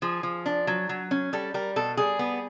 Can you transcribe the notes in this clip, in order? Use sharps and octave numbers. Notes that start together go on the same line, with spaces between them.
F3 G#4
F3
D4
F#3
F#3
C#4
G3 A4
G3 A#4
B2 A4
G3 G#4
B3